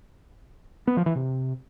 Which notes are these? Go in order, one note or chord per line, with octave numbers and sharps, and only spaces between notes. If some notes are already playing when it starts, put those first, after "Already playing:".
B3
F3
E3
C3